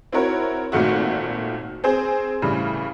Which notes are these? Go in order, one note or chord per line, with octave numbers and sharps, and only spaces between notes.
C4 E4 F#4 A#4 C#5
G#1 A#2 D#3 A3 F#4
C4 G#4 C5
A2 C#3 E3 G3